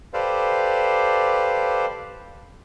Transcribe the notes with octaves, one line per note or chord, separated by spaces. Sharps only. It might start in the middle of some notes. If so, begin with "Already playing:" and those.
G4 A4 B4 C5 D5 F5